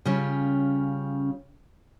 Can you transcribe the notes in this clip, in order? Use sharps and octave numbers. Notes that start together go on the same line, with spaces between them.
C#3 G3 C#4 F4